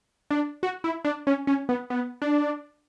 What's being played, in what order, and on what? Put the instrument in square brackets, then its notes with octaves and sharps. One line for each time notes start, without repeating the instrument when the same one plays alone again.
[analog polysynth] D4
F#4
E4
D4
C#4
C#4
B3
B3
D4